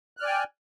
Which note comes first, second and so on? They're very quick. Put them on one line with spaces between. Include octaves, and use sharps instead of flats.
F#6 F6 D5 G#5 G5